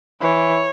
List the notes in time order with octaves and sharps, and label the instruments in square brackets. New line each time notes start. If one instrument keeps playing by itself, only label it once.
[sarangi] E3 [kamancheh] C#5